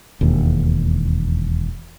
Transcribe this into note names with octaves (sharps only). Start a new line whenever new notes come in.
E1 D#2